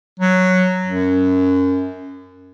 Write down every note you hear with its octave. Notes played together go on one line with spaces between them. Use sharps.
F#3
F#2